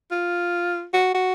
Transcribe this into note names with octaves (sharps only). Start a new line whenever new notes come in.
F4
F#4
F#4